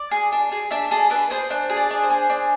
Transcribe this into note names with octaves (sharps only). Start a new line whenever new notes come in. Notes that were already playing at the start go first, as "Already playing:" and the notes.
Already playing: D5
G#4
D4
G#4
D4 E5
G#4 A4
D4 B4
G#4 C5
D4 C5
G#4
D5
D4
C5
G#4
D4